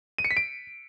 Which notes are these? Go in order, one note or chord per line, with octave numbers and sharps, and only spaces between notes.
D#7
C#7
B6
D7